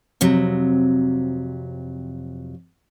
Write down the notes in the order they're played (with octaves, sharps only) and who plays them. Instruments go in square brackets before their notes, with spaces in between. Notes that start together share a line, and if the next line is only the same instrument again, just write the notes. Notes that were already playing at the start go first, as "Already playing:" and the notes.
[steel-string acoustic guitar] F2 C3 F#3